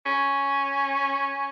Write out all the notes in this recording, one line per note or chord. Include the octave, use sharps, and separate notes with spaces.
C#4